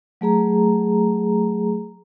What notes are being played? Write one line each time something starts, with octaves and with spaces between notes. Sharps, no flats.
F#3 A3 G#4 A#5